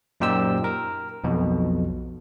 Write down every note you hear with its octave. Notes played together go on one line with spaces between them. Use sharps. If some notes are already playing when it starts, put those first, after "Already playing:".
F#2 A#2 D#4 G4 C5 E6
A#4
B1 F2 B2